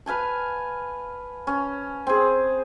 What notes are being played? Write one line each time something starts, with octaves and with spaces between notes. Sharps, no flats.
B4 F5 G#5 A5
C#4
C4 G#4